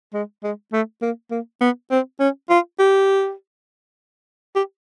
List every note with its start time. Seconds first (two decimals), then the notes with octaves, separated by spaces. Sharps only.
0.14 G#3
0.43 G#3
0.73 A3
1.02 A#3
1.31 A#3
1.61 B3
1.91 C4
2.20 C#4
2.50 F4
2.79 G4
4.55 G4